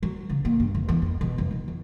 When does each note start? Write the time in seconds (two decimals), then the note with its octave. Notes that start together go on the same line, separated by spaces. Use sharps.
0.03 F#3
0.30 C#3
0.45 A#2
0.60 G2
0.75 F1
0.89 E2
1.02 F2
1.21 B2
1.38 F1
1.51 D#3
1.68 F2